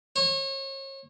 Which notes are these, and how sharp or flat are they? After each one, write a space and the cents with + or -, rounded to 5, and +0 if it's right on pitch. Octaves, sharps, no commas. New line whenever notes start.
C#5 -35